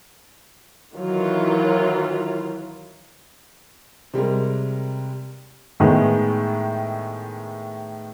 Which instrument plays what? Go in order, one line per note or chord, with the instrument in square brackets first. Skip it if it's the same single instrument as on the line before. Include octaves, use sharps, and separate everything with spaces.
[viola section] D#3 E3 F#3 F4
[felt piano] C3 G3 G#3 A#4
[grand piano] A2 D#3 G#3 B3